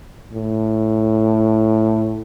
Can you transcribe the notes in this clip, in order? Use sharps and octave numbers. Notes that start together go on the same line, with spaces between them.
A2